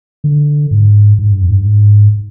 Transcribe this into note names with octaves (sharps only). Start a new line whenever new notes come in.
D3
G#2
G#2
G2
F2
G#2
G2
G#2